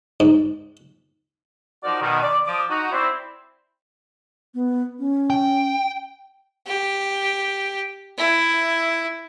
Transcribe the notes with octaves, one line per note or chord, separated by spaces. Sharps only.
G#2
F3 D#4 F#4 A#4 D5
B2 D#3
D5
F3 D6 D#6
D#4 F#4
C4 E4 C5 D5
B3
C#4
G5
G4
E4